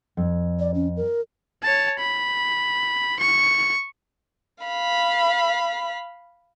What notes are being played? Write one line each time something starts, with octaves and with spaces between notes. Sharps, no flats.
F2
D5
C#4
A#4
C#5 A5
B5
C#6
F5 B5